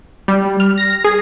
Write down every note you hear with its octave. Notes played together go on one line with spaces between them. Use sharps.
G3
F6
A#6
G#4